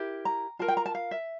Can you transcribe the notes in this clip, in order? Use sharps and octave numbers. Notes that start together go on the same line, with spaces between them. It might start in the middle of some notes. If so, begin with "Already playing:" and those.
Already playing: E4 G4 A#4
A#5
F4 A#4 A5
G5
A#5
A5
F5
E5